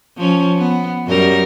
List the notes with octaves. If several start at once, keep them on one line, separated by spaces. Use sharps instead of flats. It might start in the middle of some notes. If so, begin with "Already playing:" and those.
F3 C#4
B3
F#2 G3 A#4